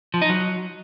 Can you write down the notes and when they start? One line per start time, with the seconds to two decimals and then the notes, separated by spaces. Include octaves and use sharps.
0.14 F3
0.22 D#4
0.29 F#3